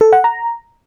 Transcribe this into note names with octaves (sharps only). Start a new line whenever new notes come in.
A4
F#5
A#5